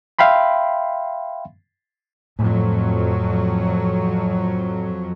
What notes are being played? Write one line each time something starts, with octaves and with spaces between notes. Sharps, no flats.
E5 F5 G5 B5 C6
F2 A2 F#3